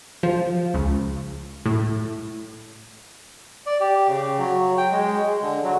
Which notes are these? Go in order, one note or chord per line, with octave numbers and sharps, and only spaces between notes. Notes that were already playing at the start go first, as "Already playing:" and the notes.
F3
C#2
A2
D5
G4
C#3
F#3
G5
G#3
G#3
D3
F#3